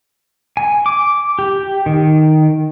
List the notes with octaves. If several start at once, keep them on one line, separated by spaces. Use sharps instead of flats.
G#5
D6
G4
D#3